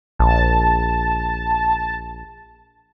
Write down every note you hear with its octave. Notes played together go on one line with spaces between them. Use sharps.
A#1 A5